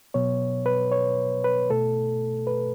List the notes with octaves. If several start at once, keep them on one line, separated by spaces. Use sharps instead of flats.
B2 F#3 B3 C#5
B4
C#5
B4
B2 A3 A4
B4